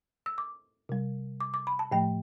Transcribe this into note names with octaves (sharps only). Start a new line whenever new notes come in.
E6
D6
C3 G3
D6
D6
B5
A5
A2 F3 A3 G5